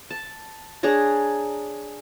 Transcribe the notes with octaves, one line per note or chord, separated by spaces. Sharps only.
A5
D4 G#4 C#5 A#5